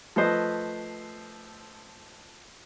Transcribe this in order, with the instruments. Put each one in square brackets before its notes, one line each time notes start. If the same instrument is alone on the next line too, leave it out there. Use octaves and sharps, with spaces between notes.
[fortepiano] F3 A3 B4 C5 D#5